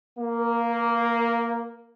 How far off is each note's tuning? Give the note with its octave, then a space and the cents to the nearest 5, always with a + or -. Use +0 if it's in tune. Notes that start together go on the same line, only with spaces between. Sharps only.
A#3 +0 A#4 +40